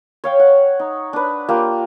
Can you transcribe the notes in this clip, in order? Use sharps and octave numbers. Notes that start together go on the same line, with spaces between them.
C#5 F5 G5
F#5
D#4
D4 B4
A#3 F4 G4